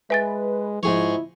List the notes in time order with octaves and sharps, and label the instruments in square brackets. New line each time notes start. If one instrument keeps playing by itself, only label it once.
[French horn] G#3 [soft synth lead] B4 [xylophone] E5 G#5 A6
[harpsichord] G#2 G#4 C#5 [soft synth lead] F3 [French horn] E4